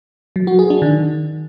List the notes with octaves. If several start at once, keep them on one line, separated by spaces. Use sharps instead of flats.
F#3
F#4
G#4
D4
D#3